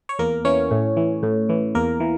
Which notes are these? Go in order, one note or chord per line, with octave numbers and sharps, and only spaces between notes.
C#5
E2 A#3 A#4
E3 C#4 C#5
A2
E3
A2
E3
E2 A#3 A#4
E3